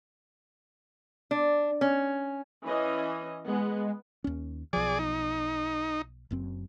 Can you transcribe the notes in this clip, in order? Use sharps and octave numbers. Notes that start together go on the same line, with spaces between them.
D4
C#4
E3 C#4 D#5
G#3 B3
D#2 C#4
B1 F3 G#4 D5
D#4
F#1 F#2 C4